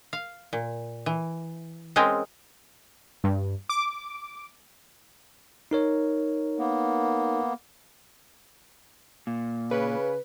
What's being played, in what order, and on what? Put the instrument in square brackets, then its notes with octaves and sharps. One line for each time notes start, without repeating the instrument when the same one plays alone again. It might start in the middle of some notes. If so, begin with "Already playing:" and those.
[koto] F5
A#2
E3
G#3 C4 C#4 G#4 A#4
[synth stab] G2
D6
[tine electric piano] D#4 A#4 C#5
[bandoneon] A#3 B3
[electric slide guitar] A#2
[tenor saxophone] C#3 [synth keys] B4